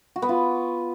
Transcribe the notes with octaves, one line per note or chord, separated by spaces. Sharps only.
F#4
B3
F4